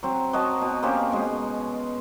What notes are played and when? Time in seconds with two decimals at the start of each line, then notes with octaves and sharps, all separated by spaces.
0.03 F#3 C4
0.33 F#3 F#4 D#5 A5
0.61 B2
0.83 A#3 C4 C#4 G4
1.12 B2 G#3